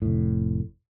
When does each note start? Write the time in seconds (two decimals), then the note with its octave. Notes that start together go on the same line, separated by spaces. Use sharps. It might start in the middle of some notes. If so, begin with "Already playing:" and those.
0.02 F1 A2